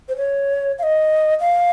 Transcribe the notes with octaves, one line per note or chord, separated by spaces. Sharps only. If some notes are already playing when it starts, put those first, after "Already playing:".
C5
C#5
F5
D#5
F5